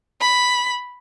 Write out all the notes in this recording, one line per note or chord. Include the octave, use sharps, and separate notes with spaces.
B5